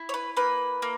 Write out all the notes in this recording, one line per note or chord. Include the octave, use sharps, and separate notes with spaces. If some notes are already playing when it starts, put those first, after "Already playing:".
Already playing: E4
C#5
B4
A#3 B4
A#3